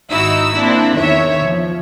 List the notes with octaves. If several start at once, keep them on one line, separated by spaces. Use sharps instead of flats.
G#1 D#4 E4 F#4 E6
A#3 C4 D4 E4
E2 D#3 C#5 E5
F3